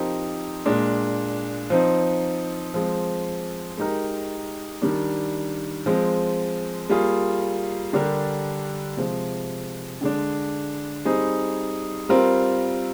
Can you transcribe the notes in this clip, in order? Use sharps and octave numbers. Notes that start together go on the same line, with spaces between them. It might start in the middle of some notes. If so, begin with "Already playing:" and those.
Already playing: F3 C4 D#4 G4 A#4
A#2 G#3 D4
F3 C4 D#4
F3 G#3 C4
G#3 D#4 G4 A#4
D#3 G3 D4
F3 G#3 C4
G3 A#3 F4 G#4
D3 G3 D4 G4 A#4
C3 F3 G#3
D3 G#3 D4
G3 C4 D#4 G#4
G3 C4 F4 A#4